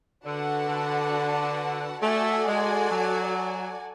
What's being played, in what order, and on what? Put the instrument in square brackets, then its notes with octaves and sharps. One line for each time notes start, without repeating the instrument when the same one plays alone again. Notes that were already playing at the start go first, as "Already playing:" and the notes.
[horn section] D3 [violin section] D4 F#4 B4 F#5 A5
[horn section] D3
[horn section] A3 [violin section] F#4 A4 D5 G#5
[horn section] G#3
F#3